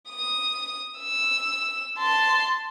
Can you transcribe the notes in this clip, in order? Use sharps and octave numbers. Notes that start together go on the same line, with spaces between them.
D#6
E6
A5 C6